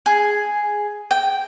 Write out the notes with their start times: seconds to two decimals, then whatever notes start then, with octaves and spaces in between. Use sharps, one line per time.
0.06 G#4
1.11 G5